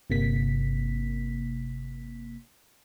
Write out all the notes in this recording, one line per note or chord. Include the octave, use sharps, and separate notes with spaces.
G1 C3 A#3 B6